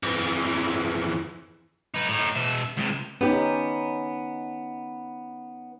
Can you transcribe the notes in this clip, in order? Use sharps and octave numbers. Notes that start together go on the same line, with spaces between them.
F2 E3
D#4 B4
A2 D#4
B2 E5
C#2 C3
B3 C#4 D#4 G4